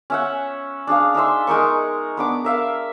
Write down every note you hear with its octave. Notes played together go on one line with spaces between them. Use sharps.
C#4 E5 F#5
D4 G#4 F5
D4 D#4 E5 C6
G#3 D#4 A#4 C#6
B3 D4 D6
A#4 E5 F5